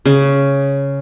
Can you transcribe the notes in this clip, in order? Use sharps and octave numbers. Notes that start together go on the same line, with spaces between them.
C#3